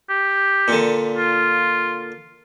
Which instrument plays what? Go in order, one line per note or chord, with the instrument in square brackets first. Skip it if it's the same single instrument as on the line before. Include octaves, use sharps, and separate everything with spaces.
[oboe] G4
[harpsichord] A#2 D3
[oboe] F4